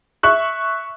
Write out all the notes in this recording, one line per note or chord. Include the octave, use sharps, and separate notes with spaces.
E5 C#6 F#6